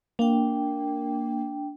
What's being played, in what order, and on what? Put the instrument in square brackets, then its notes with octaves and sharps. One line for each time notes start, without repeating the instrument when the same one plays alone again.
[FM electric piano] A#3 [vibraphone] D4 G5